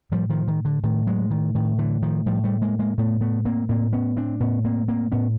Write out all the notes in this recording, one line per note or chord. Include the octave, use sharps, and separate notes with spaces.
A2 F3 G3
D#3 F3
D#3
D3
A2 D#3
F#3 G#3
D#3
A2 D#3
D3 E3
D#3 F3
A2 F3 G3
G3 A3
G#3 A#3
G#3 A#3
A2 A3 B3
A3 B3
A#3 C4
A2 A#3 C4
B3 C#4
C4 D4
A2 B3 C#4
A#3 C4
A#3 C4
A2 B3 C#4